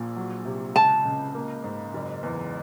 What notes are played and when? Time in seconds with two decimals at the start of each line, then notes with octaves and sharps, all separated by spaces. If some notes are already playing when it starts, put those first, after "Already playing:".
Already playing: A#1 A#2
0.16 F#3
0.45 C3
0.76 C#2 A5
1.05 C#3
1.34 A#3
1.64 G#2
1.94 F#1
2.23 E2